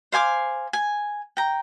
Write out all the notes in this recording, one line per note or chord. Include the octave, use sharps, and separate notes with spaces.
C5 F5 G#5 D6
G#5
G5 A#5